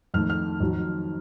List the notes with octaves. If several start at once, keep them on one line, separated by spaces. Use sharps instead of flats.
F2 D#3 A3 F6
F6
F2 D#3 F#3